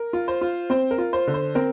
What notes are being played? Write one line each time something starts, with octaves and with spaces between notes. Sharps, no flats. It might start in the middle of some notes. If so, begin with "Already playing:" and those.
Already playing: A#4
F4
C5
F4
C4 C5
A#4
F4
C5
D3
C5
C4 A#4